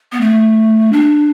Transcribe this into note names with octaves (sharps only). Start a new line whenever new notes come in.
B3
A3
D4